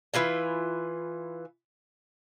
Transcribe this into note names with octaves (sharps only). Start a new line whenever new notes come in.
E3 E4 F4 G#5